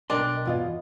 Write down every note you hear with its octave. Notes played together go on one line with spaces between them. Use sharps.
B1 D4 A#4 D#5 G5 C6
E2 F4 D#5